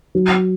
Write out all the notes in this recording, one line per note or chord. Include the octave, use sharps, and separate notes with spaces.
F#3